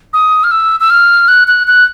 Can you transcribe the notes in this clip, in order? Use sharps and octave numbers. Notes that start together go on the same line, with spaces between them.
D#6
F6
E6
E6
F6
F#6
F#6
F#6